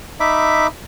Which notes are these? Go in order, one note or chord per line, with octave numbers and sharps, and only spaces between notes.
D#4 E5 B5 D6